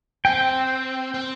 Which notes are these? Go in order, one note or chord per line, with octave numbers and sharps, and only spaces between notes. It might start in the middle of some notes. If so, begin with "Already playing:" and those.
C4 G5
C4